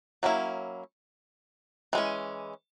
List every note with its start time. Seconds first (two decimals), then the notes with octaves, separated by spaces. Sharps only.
0.23 F#3 A#3 C#4 E4
1.93 E3 G#3 C#4